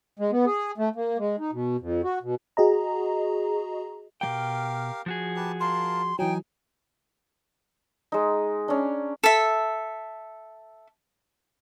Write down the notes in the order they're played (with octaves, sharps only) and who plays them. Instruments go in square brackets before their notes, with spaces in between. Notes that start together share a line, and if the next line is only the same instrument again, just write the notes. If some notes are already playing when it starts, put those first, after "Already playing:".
[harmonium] G#3
B3
G#4
A3
A#3
G#3
D#4
B2
F2
F#4
B2
[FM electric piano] F#4 G#4 D#5 A#5
[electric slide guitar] B2 G3 G5 [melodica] G4 A#4 F5
[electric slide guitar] F3 F#4 G#4
[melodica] G4 B4 A5
[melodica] F4 A#4 A5 [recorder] C6
[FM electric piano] E3 F#3 [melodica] D#4 G#5 [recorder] G5
[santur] G#3 D#4
C#4 D4
[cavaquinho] A4 E5